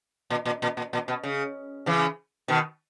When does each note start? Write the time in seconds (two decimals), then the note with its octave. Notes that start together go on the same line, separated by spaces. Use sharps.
0.30 A#2
0.45 A#2
0.62 A#2
0.77 A#2
0.93 A#2
1.08 B2
1.23 C#3
1.86 C#3 E3
2.48 B2 D#3